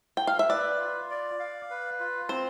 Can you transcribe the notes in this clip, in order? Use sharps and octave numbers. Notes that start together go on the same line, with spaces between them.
G5
F5
E5
B4 D5
F4
D5
F5
B4
F4
C4 C5